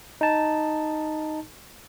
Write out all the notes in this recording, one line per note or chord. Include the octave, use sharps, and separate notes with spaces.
D#4 A5